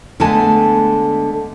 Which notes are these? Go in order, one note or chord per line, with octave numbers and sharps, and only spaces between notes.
D3 G#3 A3 B3 G#5 A5